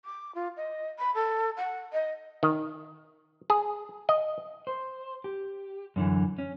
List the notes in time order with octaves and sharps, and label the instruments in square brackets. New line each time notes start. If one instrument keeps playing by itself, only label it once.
[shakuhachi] D6
F4
D#5
B5
A4
F#5
D#5
[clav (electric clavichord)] D#3
G#4
D#5
[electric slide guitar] C5
G4
F#2 D3 E3
C#4